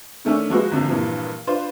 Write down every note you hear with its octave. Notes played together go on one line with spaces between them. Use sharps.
D#3 A3 C#4 D4
F3 G#3 F#4 B4
G#1 D3 F3
G2 A#2 E3 F3
D4 F4 B4 C5